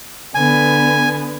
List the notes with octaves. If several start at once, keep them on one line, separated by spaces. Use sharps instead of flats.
D3 B3 G#5